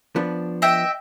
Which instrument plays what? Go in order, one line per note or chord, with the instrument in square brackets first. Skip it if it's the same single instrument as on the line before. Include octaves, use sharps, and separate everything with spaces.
[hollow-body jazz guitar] F3 B3 D4
[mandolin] D#5 E5 G5